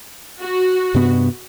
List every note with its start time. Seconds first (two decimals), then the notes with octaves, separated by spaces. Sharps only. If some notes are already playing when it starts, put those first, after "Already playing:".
0.42 F#4
0.94 G2 C3 B3